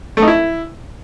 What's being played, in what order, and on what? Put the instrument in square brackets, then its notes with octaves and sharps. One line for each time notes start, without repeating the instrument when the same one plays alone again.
[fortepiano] A3
D#4
E4